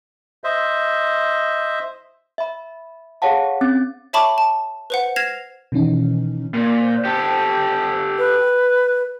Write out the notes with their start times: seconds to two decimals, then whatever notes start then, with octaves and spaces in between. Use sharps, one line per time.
0.44 C5 D#5 E5
2.38 E5 B5
3.22 G#4 A4 C#5 F5 F#5 A5
3.61 C4 C#4 A6
4.13 C#5 E5 A5 B5 C#6 D6
4.38 A5
4.90 B4 C5 F#5
5.16 F6 G#6 A#6 C7 E7 F7
5.72 B2 D#3 E3 C#4 D#4
6.54 A#2
6.81 C5
7.05 G4 A4
8.18 B4